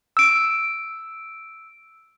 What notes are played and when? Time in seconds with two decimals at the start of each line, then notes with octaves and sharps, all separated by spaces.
0.17 E6 D7